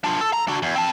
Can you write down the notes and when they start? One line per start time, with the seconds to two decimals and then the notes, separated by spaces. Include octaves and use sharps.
0.04 D4 F4
0.21 A4
0.33 A#5
0.48 D4 F#4
0.62 E2
0.75 C4 A5